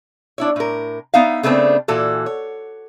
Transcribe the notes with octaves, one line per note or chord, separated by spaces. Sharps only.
D4 E4 C#5
A2 A#4
B3 D#4 E5 F5
C#3 A3 B3 C4 D4
A#2 E3 F#4 A4
C#5